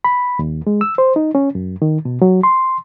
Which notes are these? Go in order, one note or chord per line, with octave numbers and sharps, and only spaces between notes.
B5
D#2
G#3
E6
C5
D#4
C#4
F#2
D#3
B2
F#3
C6